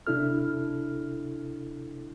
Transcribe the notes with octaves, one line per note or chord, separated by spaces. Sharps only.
C3 D4 E4 A4 F6